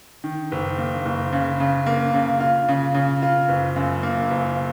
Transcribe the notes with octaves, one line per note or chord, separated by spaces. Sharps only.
D#3
F#1
A#3
F#1
C#3
C#3
A#3
C#3
F4
C#3
C#3
F4
F#1
F#2
A#3
F#1